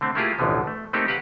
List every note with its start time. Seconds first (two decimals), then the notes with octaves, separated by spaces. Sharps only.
0.01 D3 A3 C4
0.15 A3 A#3 E4 F4 G4 G#4
0.38 A1 D2 B2 D3 E3 F3
0.67 A3
0.93 A3 A#3 C4 D#4 G4 A4
1.08 G4 B4 F5 F#5